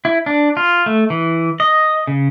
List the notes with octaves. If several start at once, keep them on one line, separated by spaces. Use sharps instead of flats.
E4
D4
F4
A3
E3
D#5
C#3